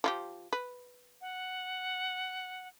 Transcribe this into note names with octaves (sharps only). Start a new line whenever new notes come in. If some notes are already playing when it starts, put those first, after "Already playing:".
F3 E4 G4
B4
F#5